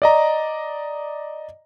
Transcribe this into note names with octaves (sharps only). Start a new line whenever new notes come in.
D5 D#5 A#5